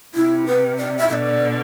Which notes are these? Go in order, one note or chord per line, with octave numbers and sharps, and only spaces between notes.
C3 E4
B4
D5
E5
B2 D3 E5
D5